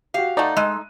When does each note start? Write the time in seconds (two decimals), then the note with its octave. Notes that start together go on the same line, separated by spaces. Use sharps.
0.14 F#4 G4 F5
0.37 A3 D#4 D5 F#5
0.57 G#3 E6 D#7